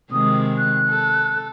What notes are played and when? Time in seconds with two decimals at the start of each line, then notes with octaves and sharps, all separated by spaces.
0.12 C3 D#3 G#3 D#6
0.57 F#6
0.90 A4